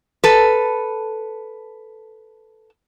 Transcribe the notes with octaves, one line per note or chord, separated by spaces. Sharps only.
A4 B4